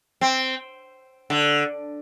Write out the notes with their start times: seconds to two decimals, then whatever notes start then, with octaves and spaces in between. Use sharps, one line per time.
0.21 C4
1.30 D3